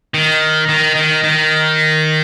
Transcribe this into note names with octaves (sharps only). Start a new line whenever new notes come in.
D#3
D#3
D#3
D#3